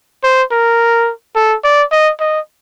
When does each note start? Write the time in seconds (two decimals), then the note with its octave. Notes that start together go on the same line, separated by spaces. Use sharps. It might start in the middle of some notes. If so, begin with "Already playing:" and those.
0.23 C5
0.52 A#4
1.35 A4
1.64 D5
1.92 D#5
2.20 D#5